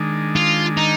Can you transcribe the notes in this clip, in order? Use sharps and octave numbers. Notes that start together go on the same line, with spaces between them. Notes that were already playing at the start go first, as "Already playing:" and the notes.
Already playing: D#3 G#3 D4
F4
D#4